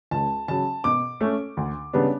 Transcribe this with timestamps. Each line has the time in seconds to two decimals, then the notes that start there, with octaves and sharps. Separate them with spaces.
0.11 C#2 A5
0.48 C#3 F#3 A5
0.84 B2 D6
1.21 A3 C#4
1.57 D2
1.93 C#3 G3 B3 D4